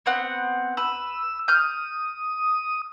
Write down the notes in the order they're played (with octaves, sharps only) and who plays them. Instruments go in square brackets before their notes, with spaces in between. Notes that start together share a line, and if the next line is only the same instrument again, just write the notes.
[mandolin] B3 C4 F#5
[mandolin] B4 [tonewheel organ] E6
[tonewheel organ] D#6 [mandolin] F6 G6